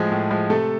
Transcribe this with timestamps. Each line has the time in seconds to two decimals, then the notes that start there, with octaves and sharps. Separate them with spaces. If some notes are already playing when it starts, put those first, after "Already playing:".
Already playing: A2 F3 G#3 G#4
0.12 A2
0.31 F3 G#3
0.50 C3 A3 A4